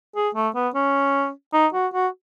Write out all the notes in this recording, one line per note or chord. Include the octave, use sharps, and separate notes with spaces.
G#4
A3
B3
C#4
D#4
F#4
F#4